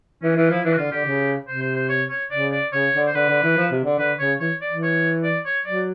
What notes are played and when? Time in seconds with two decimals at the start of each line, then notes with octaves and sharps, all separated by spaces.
0.22 E3 C#4
0.36 E3 F4
0.50 F3 E4
0.64 E3 D4
0.73 F#4
0.78 D3 F4
0.92 D3 G4
1.06 C#3
1.48 C3 C5
1.62 C5
1.76 C5
1.89 C#5
2.10 C#5
2.31 C#3 D5
2.52 D5
2.73 C#3 C#5
2.94 D3
3.07 C5
3.15 D3 B4
3.29 D3
3.43 E3
3.57 F3
3.71 C3
3.84 D3
3.98 D3 B4
4.19 C#3 C#5
4.40 E3 C#5
4.61 D5
4.69 E3
4.83 C#5
5.24 D5
5.45 C#5
5.66 F#3 D5